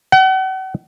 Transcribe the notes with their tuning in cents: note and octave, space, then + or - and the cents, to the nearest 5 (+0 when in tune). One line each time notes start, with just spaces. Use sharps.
F#5 +40